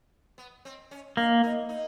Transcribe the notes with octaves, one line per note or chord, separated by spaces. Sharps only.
B3
C4
C#4
A#3 D4
D#4
D#4